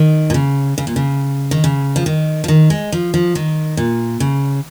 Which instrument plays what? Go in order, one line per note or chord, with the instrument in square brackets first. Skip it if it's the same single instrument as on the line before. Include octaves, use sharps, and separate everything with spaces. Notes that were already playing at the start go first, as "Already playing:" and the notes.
Already playing: [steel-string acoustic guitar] D#3
A#2
C#3
C#3
A#2
C#3
D#3
C#3
F3
D#3
F3
D#3
G#3
F3
F3
D#3
A#2
C#3